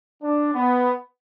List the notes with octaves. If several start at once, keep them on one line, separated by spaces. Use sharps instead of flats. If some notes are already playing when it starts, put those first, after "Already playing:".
D4
B3